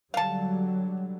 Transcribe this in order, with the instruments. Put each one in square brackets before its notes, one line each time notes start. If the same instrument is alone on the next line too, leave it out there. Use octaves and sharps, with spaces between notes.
[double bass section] D3 F#3 G3 [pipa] F5 A5